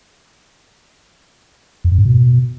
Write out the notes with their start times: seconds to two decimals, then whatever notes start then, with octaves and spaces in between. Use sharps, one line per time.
1.84 F2
1.91 F#2
1.98 G#2
2.05 B2